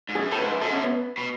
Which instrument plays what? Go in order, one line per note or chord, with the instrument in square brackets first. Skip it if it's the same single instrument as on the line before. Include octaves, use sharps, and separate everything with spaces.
[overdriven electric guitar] G#2
[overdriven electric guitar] F#2 [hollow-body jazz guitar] G#4
[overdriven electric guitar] A2 [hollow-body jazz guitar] A4
[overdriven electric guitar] G#2 [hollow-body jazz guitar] B4
[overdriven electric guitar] F#2
[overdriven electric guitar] G#2 [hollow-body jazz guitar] A4
[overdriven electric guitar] F#2 [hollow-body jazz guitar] C#4
[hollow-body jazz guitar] B3
[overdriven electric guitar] B2